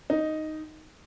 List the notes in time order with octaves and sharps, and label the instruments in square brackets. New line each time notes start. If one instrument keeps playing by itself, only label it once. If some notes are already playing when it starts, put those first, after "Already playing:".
[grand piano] D#4